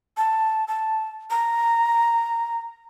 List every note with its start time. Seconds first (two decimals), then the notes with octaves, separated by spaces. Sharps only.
0.17 A5
0.68 A5
1.30 A#5